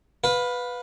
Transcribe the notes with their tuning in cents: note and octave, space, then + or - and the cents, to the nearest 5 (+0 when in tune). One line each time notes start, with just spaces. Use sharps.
B4 +0 F5 +30